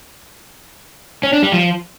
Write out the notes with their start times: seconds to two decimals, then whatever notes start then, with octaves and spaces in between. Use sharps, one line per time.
1.23 C#4
1.33 D4
1.43 G3
1.52 F3